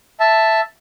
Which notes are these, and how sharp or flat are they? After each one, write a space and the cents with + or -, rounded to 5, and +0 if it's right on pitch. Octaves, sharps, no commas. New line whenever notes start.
E5 +0 A5 +0